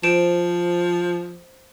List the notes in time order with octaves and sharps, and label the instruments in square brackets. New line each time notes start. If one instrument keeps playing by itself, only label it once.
[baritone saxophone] F3 [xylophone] C5 D7 E7